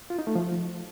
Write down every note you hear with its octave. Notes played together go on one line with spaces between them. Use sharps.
F4
D#4
A3
F3